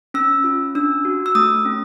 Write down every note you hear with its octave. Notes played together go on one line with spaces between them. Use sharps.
C#4 E6
F4
D4 E6
F#4
E6
A3 D#6
C#4